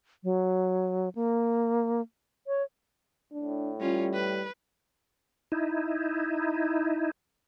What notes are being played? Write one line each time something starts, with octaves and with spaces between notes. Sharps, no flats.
F#3
A#3
C#5
A2 D4
G3 C#4 F4
B4
D#4 E4